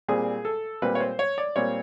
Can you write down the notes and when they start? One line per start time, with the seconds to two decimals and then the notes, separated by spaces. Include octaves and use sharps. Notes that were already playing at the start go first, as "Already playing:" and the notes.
0.08 A#2 G3 C4 G#4
0.45 A4
0.82 A#2 G3 C4 B4
0.95 C#5
1.00 C5
1.19 C#5
1.38 D5
1.56 A#2 G3 C4 C#5